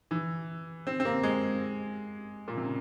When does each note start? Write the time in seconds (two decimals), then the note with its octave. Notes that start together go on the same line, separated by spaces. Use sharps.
0.11 E3
0.87 C4
1.00 C4
1.05 A#3
1.23 G#3
2.48 A#2
2.57 C3
2.65 C#3